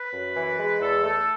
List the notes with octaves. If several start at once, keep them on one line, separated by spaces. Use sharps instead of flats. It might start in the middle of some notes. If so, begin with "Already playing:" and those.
Already playing: B4
F#2
E3
G#3
E2 A4
A3 A4